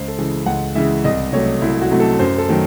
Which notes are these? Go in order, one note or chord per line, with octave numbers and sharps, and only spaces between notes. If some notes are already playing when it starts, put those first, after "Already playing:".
Already playing: C#2 C5
A4
C#3 E3 G#3
C#2 F#5
C#3 E3 G#3 E5
C2 D#5
C3 F#3 A3 C#5
C2 E4
F#4
C3 F#3 A3
A4
F#2 C5
A4
D#3 F#3 A3